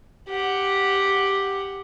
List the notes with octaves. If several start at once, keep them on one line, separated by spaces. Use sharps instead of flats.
G4 F#5